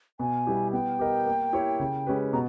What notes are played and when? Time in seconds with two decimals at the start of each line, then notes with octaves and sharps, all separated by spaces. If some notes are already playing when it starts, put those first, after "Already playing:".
0.19 B2 G#5
0.47 G3 B3 E4 G4
0.72 B3 G5
0.99 G4 A#4 D#5
1.26 A#3
1.53 E4 G4 A#4 C#5
1.80 C#3
2.07 G#3 C#4 G4 B4
2.33 B2 A#5